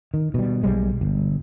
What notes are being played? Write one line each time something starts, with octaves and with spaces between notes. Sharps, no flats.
D#3
B2 G3
B1 G3 G#3
G1